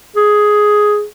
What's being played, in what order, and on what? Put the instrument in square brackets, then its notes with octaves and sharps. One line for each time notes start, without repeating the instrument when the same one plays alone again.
[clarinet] G#4